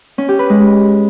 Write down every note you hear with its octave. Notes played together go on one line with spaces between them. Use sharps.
C#4
G4
B4
G#3